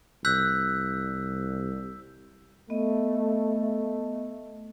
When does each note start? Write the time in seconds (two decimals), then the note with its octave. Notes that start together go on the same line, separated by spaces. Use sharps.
0.25 C2 E6 F#6 G6 B6
2.70 A3 B3 D#5